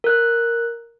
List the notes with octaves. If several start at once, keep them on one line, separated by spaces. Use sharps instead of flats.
A#4 F#6